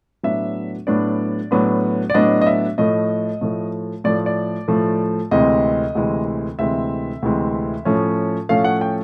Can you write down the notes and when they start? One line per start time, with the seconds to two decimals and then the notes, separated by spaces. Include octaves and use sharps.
0.23 A2 F#3 B3 D4 E5
0.87 A2 F#3 B3 D4 D5
1.51 A2 F#3 B3 D4
2.10 D5
2.14 A2 F#3 B3 D4 D#5
2.41 D#5
2.47 E5
2.78 A2 F3 A3 D#5
3.41 A2 F3 A3
4.04 A2 F3 A3 D5
4.26 D5
4.68 A2 F3 A3
5.31 D2 C3 E3 G#3 C4 D#5
5.95 D2 C3 E3 G#3 C4
6.59 D2 C3 E3 G#3 C4 E5
7.22 D2 C3 E3 G#3 C4
7.85 A2 F3 A3 C#4
8.49 A2 F3 A3 C#4 F5
8.64 F#5
8.81 G5